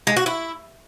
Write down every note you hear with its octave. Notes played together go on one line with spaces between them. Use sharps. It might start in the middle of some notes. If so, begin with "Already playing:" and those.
G#3
F#4
E4